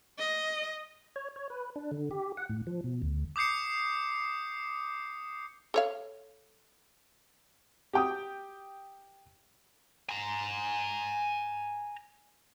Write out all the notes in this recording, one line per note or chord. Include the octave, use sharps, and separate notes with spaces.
D#5
C#5
C#5
B4
D4
D3
G4
F#5
A2
F3
B2
D2
D6 D#6 G6 C7 C#7
A4 C#5 F5
G4 G5 D#6
G#5 A#5